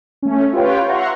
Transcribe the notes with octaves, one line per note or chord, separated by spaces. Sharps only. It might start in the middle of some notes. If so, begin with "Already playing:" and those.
A3 C#4
F4 G4 B4 C#5 G5
E5 F#5 A#5 C6 C#6